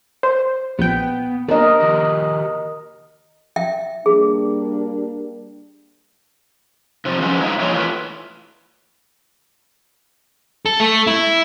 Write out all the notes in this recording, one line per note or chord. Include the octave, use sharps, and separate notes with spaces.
C5
A#1 B3 G5
A#3 D4 A#4 D5 D#5
D#3 F#4 G4
E5 G5
G3 A#3 D4 G#4
C3 F3
F3 G#3 B3 C#4
F#3 G#3 D#4 E5 F5
F3 F#3 G#3 A#3 C#5
E3 A3 F4 B4
A4
A3
E4